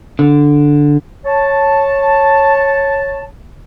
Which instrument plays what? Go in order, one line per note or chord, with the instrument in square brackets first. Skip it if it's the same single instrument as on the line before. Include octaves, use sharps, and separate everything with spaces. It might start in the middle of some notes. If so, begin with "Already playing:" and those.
[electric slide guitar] D3
[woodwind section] C#5 A5